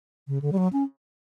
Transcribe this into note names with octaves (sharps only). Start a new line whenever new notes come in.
C#3
D3
G3
F#3
C#4